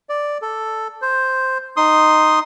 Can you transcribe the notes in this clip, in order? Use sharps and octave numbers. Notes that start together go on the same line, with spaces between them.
D5
A4
C5
D#4 C6 D#6